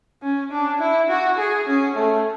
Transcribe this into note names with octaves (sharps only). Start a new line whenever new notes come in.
C#4
D4
E4
F#4
G#4
C#4
A3